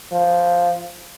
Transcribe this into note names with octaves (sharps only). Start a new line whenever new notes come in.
F3